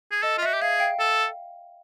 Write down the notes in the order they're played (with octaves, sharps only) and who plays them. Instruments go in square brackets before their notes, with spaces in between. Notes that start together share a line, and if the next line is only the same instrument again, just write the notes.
[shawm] G#4
[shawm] A4 [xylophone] D#5
[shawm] F4
[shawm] F#4 [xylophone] E5
[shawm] G4
[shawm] G#4 [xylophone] F5
[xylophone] F5 G5
[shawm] A4